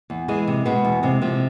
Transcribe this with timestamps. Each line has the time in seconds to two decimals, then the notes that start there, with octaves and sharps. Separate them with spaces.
0.10 E2
0.28 E3 G#3 G#4
0.48 C3
0.65 B2 G#3 B3
0.85 E2
1.03 C3 G#3 C4
1.22 C3 F3 C4